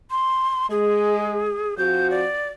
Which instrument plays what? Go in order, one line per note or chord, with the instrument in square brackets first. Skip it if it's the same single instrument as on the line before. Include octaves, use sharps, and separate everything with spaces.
[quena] C6
[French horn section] G#3 [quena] G#4
[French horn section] F3 C4 F#4 [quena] G6
[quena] D5